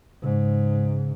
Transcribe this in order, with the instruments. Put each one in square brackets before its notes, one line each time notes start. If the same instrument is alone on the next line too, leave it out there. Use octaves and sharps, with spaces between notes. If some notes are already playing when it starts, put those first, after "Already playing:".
[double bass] G#2 [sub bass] C#3